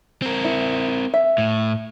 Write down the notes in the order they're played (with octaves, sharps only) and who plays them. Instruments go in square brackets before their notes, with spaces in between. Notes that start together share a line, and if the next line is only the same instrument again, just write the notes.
[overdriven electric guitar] C4 A#4
[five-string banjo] E4
E5
[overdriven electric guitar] A2